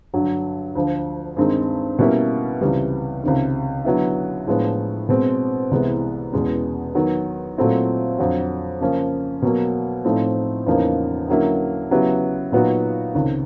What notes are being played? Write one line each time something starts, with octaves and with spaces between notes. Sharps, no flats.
G2 D3 F#3
D2 D3 F3
G2 D#3 G#3 C4 D#4
B2 G3 A#3 C#4 E4
C#2 C3 E3 G3
C#2 C3 D#3
D3 F#3 B3 E4
A2 F3 G#3 B3 D4
B2 G#3 C4
C2 C3 E3 G#3 B3
E2 B2 G#3 C#4
D#3 F#3 B3
A#2 F#3 A3 C4 E4
F2 D3 F#3
C#3 F3 A#3 C#4
B2 F#3 A#3
A2 F3 A3 C4 D#4
E2 C#3 F3 A#3 D#4
D3 F#3 A#3 C#4 E4
C#3 F#3 B3 E4 G4
A#2 F#3 B3 D#4 F#4
C#2 C3 D#3